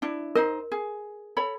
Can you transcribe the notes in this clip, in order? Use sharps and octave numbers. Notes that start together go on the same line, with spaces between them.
D4 E4
D#4 A#4 C5 D#5
G#4
A4 C#5 B5